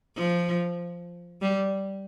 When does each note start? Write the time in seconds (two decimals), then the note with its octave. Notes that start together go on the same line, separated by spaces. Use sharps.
0.16 F3
1.42 G3